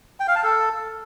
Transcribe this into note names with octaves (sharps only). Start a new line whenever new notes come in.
G5
F5
A5
A4